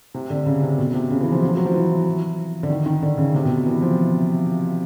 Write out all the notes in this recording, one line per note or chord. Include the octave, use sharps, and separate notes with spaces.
C3
D3
C#3
C3
B2
C3
C#3
E3
F3
F#3
F3
F#3
F3
E3
D3
D#3
D#3
D3
C#3
C3
B2
E3
F3